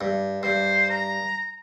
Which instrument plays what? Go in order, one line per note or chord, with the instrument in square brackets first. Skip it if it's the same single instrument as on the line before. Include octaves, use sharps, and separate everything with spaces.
[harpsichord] G2
[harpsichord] G2 [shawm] C5
[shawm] A#5